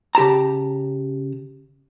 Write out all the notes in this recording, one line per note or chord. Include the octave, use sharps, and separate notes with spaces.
C#3 G4 A5 A#5